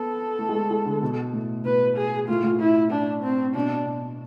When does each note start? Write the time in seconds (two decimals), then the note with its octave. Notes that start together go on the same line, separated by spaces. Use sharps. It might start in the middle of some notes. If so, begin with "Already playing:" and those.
Already playing: B3 A4
0.39 A3
0.49 G#3
0.54 A3
0.71 G#3
0.86 D3
1.02 B2
1.33 A2
1.65 B2 B4
1.97 G#4
2.29 A2 F4
2.43 A2
2.60 E4
2.92 D4
3.23 C4
3.55 B2 D4
3.87 B2